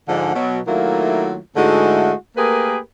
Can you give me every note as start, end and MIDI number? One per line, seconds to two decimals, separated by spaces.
0.09 0.35 44
0.09 0.35 50
0.09 0.35 53
0.09 0.35 56
0.09 0.35 62
0.09 0.35 78
0.35 0.61 47
0.35 0.61 54
0.68 1.38 51
0.68 1.38 54
0.68 1.38 57
0.68 1.38 58
0.68 1.38 64
0.68 1.38 65
1.57 2.13 44
1.57 2.13 50
1.57 2.13 56
1.57 2.13 57
1.57 2.13 64
1.57 2.13 66
2.37 2.79 57
2.37 2.79 58
2.37 2.79 67
2.37 2.79 68
2.37 2.79 70
2.37 2.79 71